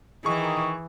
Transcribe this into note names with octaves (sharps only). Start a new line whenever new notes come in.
D#3 E3 G#4 C#6 D#6